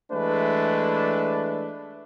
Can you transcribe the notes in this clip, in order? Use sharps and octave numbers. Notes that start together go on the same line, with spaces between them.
E3 G#3 A3 D4 B4